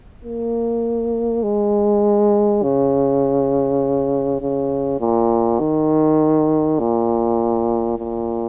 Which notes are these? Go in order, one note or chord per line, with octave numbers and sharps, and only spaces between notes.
A#3
G#3
C#3
C#3
A#2
D#3
A#2
A#2